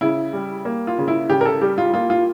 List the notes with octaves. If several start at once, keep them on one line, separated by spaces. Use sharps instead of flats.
C#3 E4
G3
A#3
F4
C#3
E4
C#3 G4
A#4
A4
G3 G4
F4
A#3 F4
F4